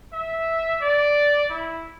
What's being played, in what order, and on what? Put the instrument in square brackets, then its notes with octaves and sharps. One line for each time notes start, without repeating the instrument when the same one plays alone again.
[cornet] E5
D5
E4